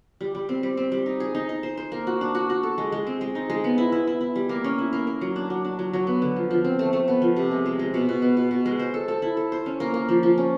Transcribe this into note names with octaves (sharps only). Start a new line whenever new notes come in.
G3
G3
C4
G3
C4
G3
D#4
G#4
D#4
D#4
C5
C5
A#3
F#4
D4
F#4
F#4
A4
G#3
G#3
C4
G#3
D#4
G#3
B3
E4
E4
E4
E4
G3
A#3
C#4
E4
A#3
A#3
F#3
D4
F#3
D4
F#3
F#3
B3
D3
F3
F3
C4
A3
A3
B3
F3
C3
G#3
G#3
G#3
B2
B2
B3
B2
B2
G#3
C5
A4
A4
E4
A4
C5
C#4
A#3
A#3
F3
F3
C#4